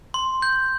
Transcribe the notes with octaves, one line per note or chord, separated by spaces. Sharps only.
C6
G6